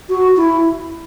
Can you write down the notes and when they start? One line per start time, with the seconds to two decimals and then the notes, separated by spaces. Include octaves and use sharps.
0.09 F#4
0.37 E4